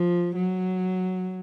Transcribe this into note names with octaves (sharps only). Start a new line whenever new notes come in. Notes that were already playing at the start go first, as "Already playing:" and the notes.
Already playing: F3
F#3